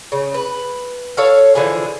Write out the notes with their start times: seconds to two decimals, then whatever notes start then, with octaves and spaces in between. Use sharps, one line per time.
0.12 C#3
0.34 B4
1.17 A4 C#5 F5
1.55 D3 E3 F3 G#4